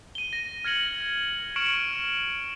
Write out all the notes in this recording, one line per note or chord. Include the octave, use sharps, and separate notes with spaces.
D#7 G7
A#6
F6 G#6 A#6 C#7 F#7
C#6 F6 C#7 D7 E7 F#7